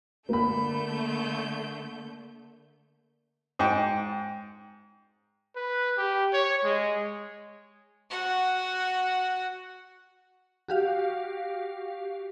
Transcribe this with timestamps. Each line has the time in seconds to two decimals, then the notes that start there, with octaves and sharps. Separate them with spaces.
0.29 D3 A3 A#3 B5 G6
3.59 G#2 G5
5.56 B4
5.98 G4
6.33 C#5
6.64 G#3
8.10 F#4 F#5
10.68 F#4 G4 F5